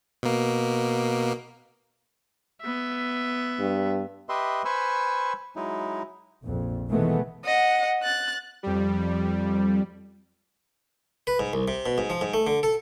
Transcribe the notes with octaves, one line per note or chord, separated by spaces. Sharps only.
B2 A#3
B3 E5
G2
G4 B4 D#5 E5 C6
B4 C5 G#5 B5 C#6 E6
F#3 G#3 D#4 E4
A#1 F2
B2 D#3 E3 G#3 A3 B3
D#5 F#5
F#6 A6
F2 G3
B4
G#2
C2
C3
B2
G#2
F3
G#2
A3
D3
A4